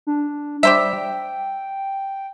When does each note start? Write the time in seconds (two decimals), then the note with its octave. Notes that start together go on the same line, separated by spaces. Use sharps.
0.07 D4
0.63 G3 G4 C5 E5
0.93 G5